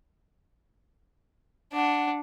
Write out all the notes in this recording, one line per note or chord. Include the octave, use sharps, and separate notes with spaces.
D4 F#5